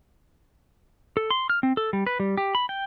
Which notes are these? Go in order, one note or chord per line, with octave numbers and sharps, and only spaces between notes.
A4
C6
F6
C4
A4
G3
B4
G3
G4
B5
G5